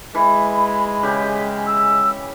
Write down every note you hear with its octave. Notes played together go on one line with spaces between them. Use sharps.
E3 G#3 B5
C#3 G4
E6